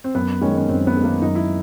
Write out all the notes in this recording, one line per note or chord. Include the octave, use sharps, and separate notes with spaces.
C4
F#2 B3
D#3 G#3 C#4
C#4
F#2 C4
B3
D#3 G#3
A#3
F#2 D#4
E4